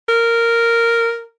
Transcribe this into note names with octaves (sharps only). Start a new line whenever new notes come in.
A#4